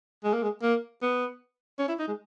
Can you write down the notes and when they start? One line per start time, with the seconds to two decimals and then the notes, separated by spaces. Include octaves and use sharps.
0.24 G#3
0.33 A#3
0.43 G#3
0.62 A#3
1.02 B3
1.79 C#4
1.88 E4
1.99 D#4
2.08 G#3